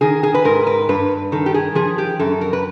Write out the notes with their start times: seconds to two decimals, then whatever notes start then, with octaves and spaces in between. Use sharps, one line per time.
0.01 D#3 G#4
0.23 G#4
0.34 B4
0.45 G#2 A#4
0.67 B4
0.89 G2 B4
1.32 D#3 A4
1.46 G4
1.54 G#4
1.75 F3 G#4
1.98 G4
2.19 F#2 A4
2.41 A#4
2.53 B4